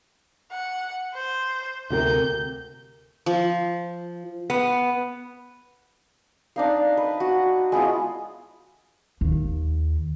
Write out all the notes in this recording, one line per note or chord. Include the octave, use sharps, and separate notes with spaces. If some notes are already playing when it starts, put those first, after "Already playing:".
F#5
C5
D2 C3 A#4 G6
F3
B3
D4 D#4 F5
B4
F#4
G#3 B3 E4 F4
D#2